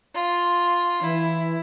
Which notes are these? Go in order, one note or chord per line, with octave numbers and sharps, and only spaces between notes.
F4
E3 E4